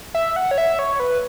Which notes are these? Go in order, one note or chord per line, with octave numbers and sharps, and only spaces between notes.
E5
F#5
C#5
E5
C#5
B4